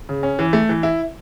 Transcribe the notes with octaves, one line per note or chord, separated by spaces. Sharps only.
C#3
C#4
E3
A3
E3
E4